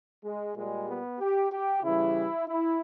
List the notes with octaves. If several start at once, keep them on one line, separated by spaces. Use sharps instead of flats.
G#3
A#2 G3 G#3
B3
G4
G4
C#3 E3 G3 E4
E4